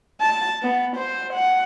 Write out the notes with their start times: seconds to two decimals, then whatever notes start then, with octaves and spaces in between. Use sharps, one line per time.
0.21 A5
0.63 B3
0.96 C5
1.33 F#5